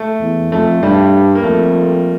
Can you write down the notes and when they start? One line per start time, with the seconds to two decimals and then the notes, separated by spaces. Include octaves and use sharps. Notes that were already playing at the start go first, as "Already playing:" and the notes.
Already playing: A3
0.21 E2
0.51 F2 A3
0.82 G2 G3
1.35 A#3
1.43 F2 A3